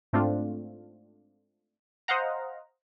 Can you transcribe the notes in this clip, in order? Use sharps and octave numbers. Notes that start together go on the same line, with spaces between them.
G#2 A3 C4 D4 F4
C5 D#5 F5 F#5 A#5